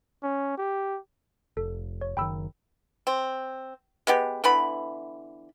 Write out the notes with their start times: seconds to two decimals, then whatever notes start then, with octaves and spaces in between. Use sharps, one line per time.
0.23 C#4
0.58 G4
1.57 F1 A4
2.01 C#5
2.17 F#1 D#3 G5 B5 E6
3.07 C4
4.07 G#3 B3 G4
4.44 D3 E3 B3 B5